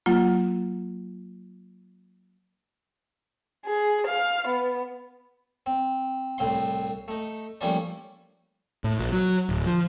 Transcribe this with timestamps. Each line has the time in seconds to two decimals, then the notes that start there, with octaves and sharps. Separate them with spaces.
0.06 F#3 A#3 F4
3.65 G#4
4.06 F5
4.47 B3
5.66 C4
6.38 C2 A2 C4 F5 C6
7.08 A3 D#4
7.61 F3 G3 A3 A#3 C#4 D4
8.84 A2
8.99 A#1
9.12 F#3
9.49 D1
9.66 F3